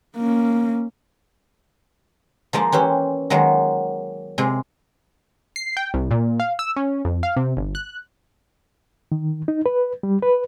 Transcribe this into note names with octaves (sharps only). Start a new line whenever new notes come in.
A#3 C#4
F3 G#3 A#3 D#4
E3 C#4 G4 C5
D#3 F#3 G#3 A#3
C3 G#3
C7
G5
C2
A#2
F5
E6
C#4
F2
F5
C3
G1
F#6
D#3
D#4
B4
G3
B4